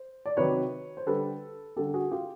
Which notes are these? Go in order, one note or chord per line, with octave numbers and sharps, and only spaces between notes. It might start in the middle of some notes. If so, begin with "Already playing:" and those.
Already playing: C5
D5
C3 D#3 F#3 B4 C#5
C5
D3 G3 A4 B4
D3 G3 G4 A4
F#4 G#4
F4 G4